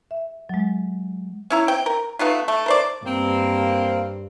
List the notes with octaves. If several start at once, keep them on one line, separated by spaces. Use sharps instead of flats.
E5
F#3 G#3
C#4 E4 A#5
C4 G5
A#4
A3 B3 D#4 F4
A3
A#4 C5 D5
G2 A#3 C4